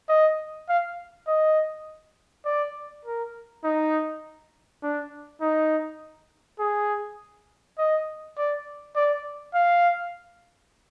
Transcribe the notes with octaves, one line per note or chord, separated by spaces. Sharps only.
D#5
F5
D#5
D5
A#4
D#4
D4
D#4
G#4
D#5
D5
D5
F5